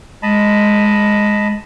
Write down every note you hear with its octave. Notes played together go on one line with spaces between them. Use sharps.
G#3 D#5 A5 B5